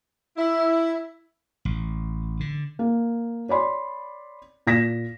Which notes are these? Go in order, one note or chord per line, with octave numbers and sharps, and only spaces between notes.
E4
A1
D3
A#3
C#5 D5 B5 C6
A#2 A#6 B6 E7